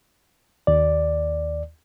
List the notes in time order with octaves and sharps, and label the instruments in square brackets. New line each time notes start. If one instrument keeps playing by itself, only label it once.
[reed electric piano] D#2 D5